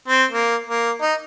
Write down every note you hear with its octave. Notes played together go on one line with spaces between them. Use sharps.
C4
A#3
A#3
D#4